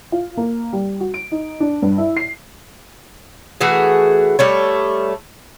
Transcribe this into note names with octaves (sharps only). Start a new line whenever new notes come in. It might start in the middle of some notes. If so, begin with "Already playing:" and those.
F4
A#3
G3
F#4
D7
D#4
D4
G2
E4
C7
E3 A3 F#4 G#4
G3 A3 C#5